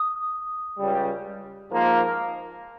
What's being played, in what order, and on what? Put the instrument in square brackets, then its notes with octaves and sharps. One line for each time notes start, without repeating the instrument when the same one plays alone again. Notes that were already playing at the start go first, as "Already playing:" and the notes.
Already playing: [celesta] D#6
[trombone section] C#2 C#3 G3
G#2 F3 A#3